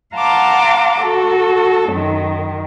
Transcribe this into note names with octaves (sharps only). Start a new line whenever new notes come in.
F5 F#5 A5 A#5 C6 D6
F#4 A4
F#2 D#3